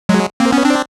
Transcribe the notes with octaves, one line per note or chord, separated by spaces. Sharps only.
F#3 G#3
A#3 C4
B3 C#4
C4 D4